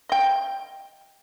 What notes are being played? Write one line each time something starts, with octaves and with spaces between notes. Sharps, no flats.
D#5 G5